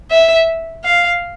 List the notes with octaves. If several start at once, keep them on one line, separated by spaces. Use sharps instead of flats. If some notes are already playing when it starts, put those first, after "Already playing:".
E5
F5